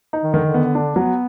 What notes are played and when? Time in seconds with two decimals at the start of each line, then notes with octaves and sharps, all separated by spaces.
0.13 D#4
0.23 D#3
0.34 D3 D#3
0.45 D3
0.54 B3
0.75 D4
0.96 F#3 B3